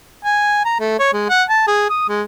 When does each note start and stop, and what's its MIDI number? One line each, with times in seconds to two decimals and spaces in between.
0.25 0.63 80
0.65 0.76 82
0.80 0.97 57
0.99 1.13 73
1.13 1.28 56
1.29 1.43 78
1.49 1.64 81
1.67 1.88 68
1.90 2.05 87
2.09 2.22 56